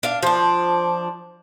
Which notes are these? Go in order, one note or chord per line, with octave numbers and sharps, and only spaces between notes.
D4 F5
F3 D4